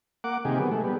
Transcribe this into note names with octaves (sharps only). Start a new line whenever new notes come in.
A#3 F#5 D6
C3 D#3 A#3 G4 G#4
F#3 B3
G#3 A3
G3 B3